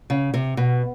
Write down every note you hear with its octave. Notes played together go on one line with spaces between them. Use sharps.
C#3
C3
B2